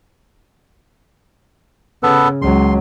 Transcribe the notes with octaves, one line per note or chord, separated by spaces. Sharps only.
C#3 B3 A4 B4
C#2 F#3 C6